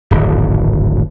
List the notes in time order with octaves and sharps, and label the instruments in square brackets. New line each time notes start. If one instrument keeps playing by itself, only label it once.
[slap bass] D1 G#1 F2